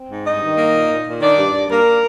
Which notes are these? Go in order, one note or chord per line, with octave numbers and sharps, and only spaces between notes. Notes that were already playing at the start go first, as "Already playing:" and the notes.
Already playing: C4
G#2
G2 D#4 D#5
D#3
A#3
A#2
A#2
A#2
D#3 D4 D5
G2
G2
G2 A#3 A#4